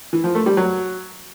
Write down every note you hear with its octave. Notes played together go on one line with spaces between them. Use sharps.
E3
F3
A3
G3
F#3